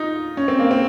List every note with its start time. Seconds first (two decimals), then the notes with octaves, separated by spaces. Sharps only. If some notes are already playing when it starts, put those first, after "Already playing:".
Already playing: D#4 F4
0.37 C#4
0.48 C4
0.59 A#3
0.71 C4